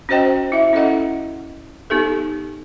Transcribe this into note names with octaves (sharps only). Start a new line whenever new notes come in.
C#4 F#4 C5 D#5 G5
E4 E5
C#4 E4 A4 D#5 F#5
B3 D#4 G4 A4